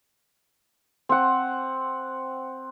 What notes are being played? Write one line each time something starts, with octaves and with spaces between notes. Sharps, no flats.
C4 F#5